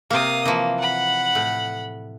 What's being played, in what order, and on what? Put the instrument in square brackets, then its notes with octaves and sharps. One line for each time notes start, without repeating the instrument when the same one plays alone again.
[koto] C3 A#3 [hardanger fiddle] F5 D#6
[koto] E3 F3 [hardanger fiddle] A#3
[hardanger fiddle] F#5 B5
[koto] A2